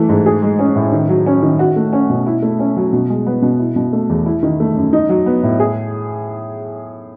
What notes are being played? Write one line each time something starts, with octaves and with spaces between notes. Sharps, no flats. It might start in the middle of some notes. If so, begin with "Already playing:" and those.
Already playing: E3 A3
G#2
G#4
G#3
C#4
A2
D#3
F#3
C#4
D#3
F#4
A3
C#4
B2
E4
A3
C#4
F#3
B2
G#3
B3
B2
E4
B2
A3
E2
E4
D#3
A3
F#2
D#4
F#3
B3
A2
G#4